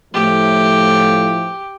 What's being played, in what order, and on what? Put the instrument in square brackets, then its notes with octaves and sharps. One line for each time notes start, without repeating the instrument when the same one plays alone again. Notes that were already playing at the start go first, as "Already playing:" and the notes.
[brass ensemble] A2 F3 A3 [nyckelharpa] G4